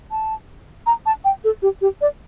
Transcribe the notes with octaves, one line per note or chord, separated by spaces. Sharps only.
A5
A#5
A5
G5
A4
G4
G4
D5